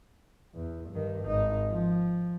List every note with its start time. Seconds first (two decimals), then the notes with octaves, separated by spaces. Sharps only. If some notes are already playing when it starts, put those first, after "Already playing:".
0.55 E2
0.90 G2 D#3
1.25 G#1 D#4
1.71 F3